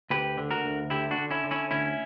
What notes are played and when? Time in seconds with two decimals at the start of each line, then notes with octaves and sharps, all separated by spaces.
0.10 D2 G4 B4
0.37 D3
0.51 F#4 A#4
0.64 D2
0.90 D3 E4 G4
1.11 D4 F#4
1.18 D3
1.30 C#4 E4
1.44 D3
1.51 C#4 E4
1.71 D2 C#4 E4